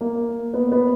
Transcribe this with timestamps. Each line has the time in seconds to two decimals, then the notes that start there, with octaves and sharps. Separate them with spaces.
0.01 A#3
0.54 B3
0.72 B3